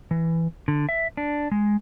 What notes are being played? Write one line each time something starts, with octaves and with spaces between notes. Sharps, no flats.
E3
D3
E5
D4
G#3